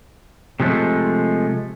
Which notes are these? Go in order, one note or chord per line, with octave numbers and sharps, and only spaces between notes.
C3 F3 G#3 A3